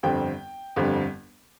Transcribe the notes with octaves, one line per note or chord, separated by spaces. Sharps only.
G1 F2 D3 G3 C4 G5
G1 F2 D3 G3 C4